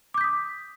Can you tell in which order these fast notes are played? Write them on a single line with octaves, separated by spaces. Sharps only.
D6 G6 B6 D#6